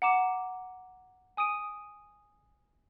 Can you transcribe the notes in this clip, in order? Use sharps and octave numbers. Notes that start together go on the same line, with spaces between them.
F#5 A#5 D6 E7
G#5 D#6 D7 D#7